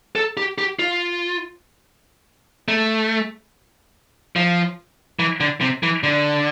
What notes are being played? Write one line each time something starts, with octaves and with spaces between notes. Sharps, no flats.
A4
G4
G4
F4
A3
F3
E3
D3
C3
E3
D3